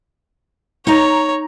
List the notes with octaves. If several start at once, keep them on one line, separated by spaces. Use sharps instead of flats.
D#4 C#5 A#5